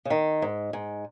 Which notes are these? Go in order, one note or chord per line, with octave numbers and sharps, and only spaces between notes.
C#3
D#3
G#2
G#2